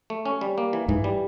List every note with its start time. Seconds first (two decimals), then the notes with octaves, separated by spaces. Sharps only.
0.10 A3
0.25 C#4
0.41 G3
0.58 A#3
0.73 E3
0.88 G#2 E3
1.04 G3